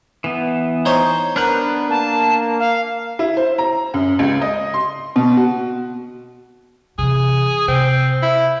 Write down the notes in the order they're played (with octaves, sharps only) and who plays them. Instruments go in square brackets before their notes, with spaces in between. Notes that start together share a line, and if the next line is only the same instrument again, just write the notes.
[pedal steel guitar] E3 B3
[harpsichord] D#4 C5 C#5
[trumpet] B3 [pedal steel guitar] D4 F#6 G6 [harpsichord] A#4 B4
[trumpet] A#3 [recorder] A5
[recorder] F5
[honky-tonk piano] E4
C5
A#5
F#2
C#2
D#5
C6
B2
F#4
[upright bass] C3 E3 [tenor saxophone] G#4
[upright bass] C3 [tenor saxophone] C4
[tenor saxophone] E4